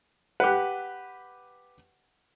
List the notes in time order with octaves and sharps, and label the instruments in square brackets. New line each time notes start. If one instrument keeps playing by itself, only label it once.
[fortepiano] G4 B4 [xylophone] F#5 F#6